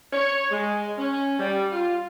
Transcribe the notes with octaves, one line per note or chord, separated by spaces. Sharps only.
C#5
G#3
C#4
G3
F4